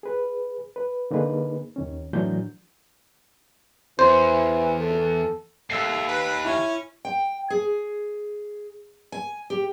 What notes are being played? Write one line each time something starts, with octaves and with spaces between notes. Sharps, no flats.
G#4 B4
B4
D3 A#3 D#4 G#4 B4
D#2 D#3 C#4
A2 E3 F#3 D4 G6
E2 E3 C5
A4
D#2 G#4 A4 E5 E6 C7
B4
C#4 E4
G5
G#4
G#5
G4